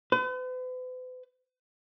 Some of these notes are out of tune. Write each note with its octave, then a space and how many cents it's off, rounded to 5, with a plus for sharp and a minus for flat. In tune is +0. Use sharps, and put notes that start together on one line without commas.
B4 +45